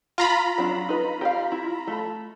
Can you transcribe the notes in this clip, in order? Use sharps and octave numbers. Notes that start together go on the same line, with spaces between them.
F4 A#5 B5
F#3 D4
D#4 B4
G4 D#5 F5
E4
A3 A4